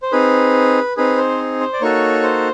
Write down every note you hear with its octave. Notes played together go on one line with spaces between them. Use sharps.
C5
C4 D#4 G#4 B4
C4 D#4 G#4 B4
C5
C5
D5
A#3 D#4 F#4 A4 C#5
C5